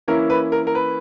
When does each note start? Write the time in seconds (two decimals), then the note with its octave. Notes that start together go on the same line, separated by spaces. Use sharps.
0.08 E3 A#3 C#4 E4 A#4
0.30 B4
0.52 A#4
0.67 A#4
0.75 B4